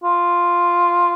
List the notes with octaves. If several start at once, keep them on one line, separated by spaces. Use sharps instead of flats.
F4